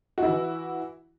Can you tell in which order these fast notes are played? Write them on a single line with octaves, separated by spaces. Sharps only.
F#4 E4 E3